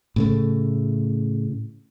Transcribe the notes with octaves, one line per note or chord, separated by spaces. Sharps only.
A2 C#3 A3